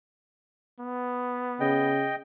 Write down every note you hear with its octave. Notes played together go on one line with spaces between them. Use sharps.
B3
C#3 D#5 G5